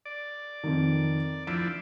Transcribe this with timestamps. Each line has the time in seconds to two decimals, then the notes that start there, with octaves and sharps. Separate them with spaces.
0.05 D5
0.64 F2 D#3
1.47 F3 D4 E4 D7